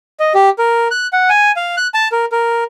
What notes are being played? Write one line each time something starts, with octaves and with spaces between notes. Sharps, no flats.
D#5
G4
A#4
F#6
F#5
G#5
F5
F#6
A5
A#4
A#4